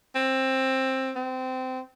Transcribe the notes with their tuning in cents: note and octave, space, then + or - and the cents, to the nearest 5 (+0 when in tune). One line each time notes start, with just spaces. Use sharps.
C4 +15
C4 -20